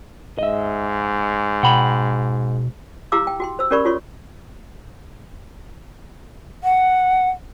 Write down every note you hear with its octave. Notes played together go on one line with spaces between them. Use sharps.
G#2 D#5 E5
B2 F#5 G5 B5
E4 G4 F5 A#5 D6 E6
G5
F#4 G5 C6
C5 E6
C#4 G4 A#4 D5 B5 C#6
F4 F#4 A4 C#5 C6 C#6
F#5